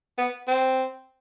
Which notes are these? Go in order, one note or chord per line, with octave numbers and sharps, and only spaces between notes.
B3
C4